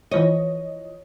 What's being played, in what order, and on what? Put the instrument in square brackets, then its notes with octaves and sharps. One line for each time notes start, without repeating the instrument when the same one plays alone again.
[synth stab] E3 F3 D#5 [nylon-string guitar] C#5